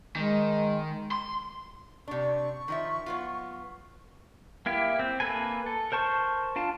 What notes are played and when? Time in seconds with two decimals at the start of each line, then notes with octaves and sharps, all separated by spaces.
0.16 D#3 G#3
1.11 C6
2.08 C3 D4 C#6
2.68 D#3 F3 E5
3.06 F#3 B3 F4
4.66 A#3 E4 G4
4.99 C4
5.20 A#3 A4 B4 G#5
5.66 A4
5.92 A#4 C5 A5 C#6
6.56 D4 F4 A5